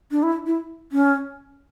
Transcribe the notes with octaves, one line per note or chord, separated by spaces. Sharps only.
D4
E4
E4
C#4